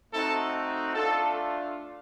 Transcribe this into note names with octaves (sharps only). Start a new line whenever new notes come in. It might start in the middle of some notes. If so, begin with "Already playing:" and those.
A3 C4 D#4 F#4 A4
A3 D4 F4 A4